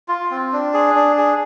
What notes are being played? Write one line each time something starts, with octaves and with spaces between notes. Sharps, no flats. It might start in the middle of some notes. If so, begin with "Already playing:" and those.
F4
C4
D4
G#4
D4
G#4